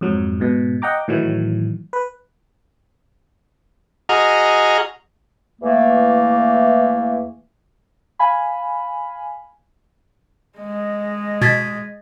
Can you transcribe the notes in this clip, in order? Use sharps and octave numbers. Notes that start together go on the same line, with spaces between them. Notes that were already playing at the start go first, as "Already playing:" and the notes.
F2 G#2 F#3
G#2 B2
D#5 F#5 G5 A#5 D6
A2 D#3 E3 F#3
B4
F#4 G#4 D#5 A#5 F6
E2 E3 A3 A#3
F5 G#5 B5
G#3 D#5
B2 G#6 A6 B6